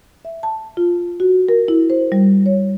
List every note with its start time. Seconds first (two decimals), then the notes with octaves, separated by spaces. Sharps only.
0.25 E5
0.43 A5
0.77 F4
1.20 F#4
1.49 A#4
1.68 E4
1.90 C5
2.12 G3
2.46 C#5